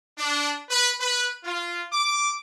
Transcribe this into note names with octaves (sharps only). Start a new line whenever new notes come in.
D4
B4
B4
F4
D6